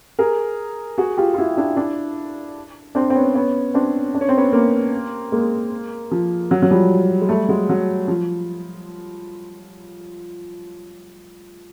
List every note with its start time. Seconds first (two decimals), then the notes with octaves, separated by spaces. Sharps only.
0.19 G#4 A#4
0.98 F#4 G#4
1.17 F4 G4
1.34 F4
1.38 E4 F#4
1.57 D4 E4
1.77 D4 E4
2.95 C4 D4
3.10 C4
3.15 B3 C#4
3.35 B3 C#4
3.74 C4 D4
4.14 D4
4.21 C#4
4.29 C4
4.37 B3 C#4
4.53 A#3 C4
5.32 G#3 A#3
6.11 F3
6.51 F#3
6.62 F#3
6.71 F3 G3
7.21 G#3
7.29 G3 A3
7.49 F#3 G#3
7.69 F#3
8.08 F3